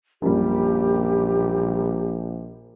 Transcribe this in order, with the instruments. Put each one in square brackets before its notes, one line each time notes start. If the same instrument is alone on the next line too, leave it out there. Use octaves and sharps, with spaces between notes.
[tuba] A#1 [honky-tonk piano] F#2 A#2 G3 [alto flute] G4